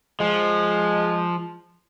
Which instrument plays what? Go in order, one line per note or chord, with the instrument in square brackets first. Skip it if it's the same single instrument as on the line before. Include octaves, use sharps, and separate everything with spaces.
[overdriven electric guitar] F3 [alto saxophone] G#3